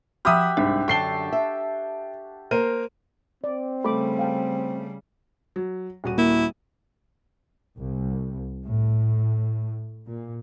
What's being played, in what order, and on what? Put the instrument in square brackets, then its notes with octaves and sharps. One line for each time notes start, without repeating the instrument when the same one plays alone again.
[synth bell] F3 F6 [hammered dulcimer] G4 E5 F#5 [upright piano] B5 D#6
[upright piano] C2 G#2 [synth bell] D4
[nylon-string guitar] F#2 D3 [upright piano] G5 C7 G7 [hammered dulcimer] A5 C#6
[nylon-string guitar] E5
[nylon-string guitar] A#3 [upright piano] A#4 C5 D#7
[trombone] C4 [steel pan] D5
[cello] C#3 G3 [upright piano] A3 [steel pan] B5 D6
[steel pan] F5 G5 A5
[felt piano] F#3
D#1 F#4 D#7
[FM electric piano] A#3 [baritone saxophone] E4
[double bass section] C2
A2
A#2